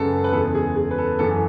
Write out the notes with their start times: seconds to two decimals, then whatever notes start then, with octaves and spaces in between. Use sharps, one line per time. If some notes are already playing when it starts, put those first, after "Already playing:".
Already playing: F#2 C#3 G#3 A4 B4
0.24 B4
0.32 E2 C#3 G#3 A4
0.54 G#4
0.76 G#4
0.91 B4
0.98 A4
1.19 F#2 E3 G#3 A4